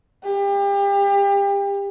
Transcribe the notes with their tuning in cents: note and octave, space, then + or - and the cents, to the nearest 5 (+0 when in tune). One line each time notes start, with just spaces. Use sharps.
G4 +30